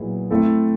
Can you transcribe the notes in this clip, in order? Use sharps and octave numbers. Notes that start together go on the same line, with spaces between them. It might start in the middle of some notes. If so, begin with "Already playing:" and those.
Already playing: A#2 F#3 B3 E4 G#4
A3 C4 E4 A4